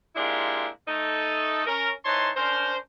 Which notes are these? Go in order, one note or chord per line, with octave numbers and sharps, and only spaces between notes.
G#3 A#3 D4 E4 F4 G4
A3 D#4 A4
C#4 A#4
E3 D#4 C5 C#5 A5 C6
C#4 D4 A#4 C5